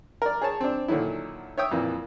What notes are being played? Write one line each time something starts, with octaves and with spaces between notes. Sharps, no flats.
A#4 D5
G#4 C#5 A5
C4 D4
A#2 D3 D#3 F#3 E4
C#5 E5 G5 D#6
F2 A#2 E3 A#3